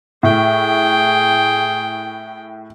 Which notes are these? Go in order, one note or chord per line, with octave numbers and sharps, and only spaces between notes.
A2 G#4 G5